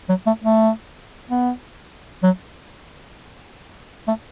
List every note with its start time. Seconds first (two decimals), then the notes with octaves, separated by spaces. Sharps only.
0.09 F#3
0.26 A3
0.44 A3
1.30 B3
2.23 F#3
4.08 A3